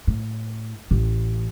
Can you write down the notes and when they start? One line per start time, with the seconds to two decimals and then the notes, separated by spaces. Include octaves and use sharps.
0.07 A2
0.91 A1 A2